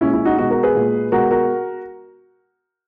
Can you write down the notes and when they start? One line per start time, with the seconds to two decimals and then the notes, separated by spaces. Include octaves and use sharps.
0.01 A#2 G#3 C#4 E4
0.13 C#4 E4
0.25 D#4 F#4
0.38 B2 G#3 D#4 F#4
0.51 F#4 A#4
0.63 G#4 B4
0.75 A#2 G#3
1.12 B2 G#3 F#4 A#4
1.31 F#4 A#4